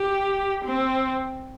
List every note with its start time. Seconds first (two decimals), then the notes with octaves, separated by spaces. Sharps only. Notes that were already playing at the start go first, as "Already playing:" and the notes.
Already playing: G4
0.65 C4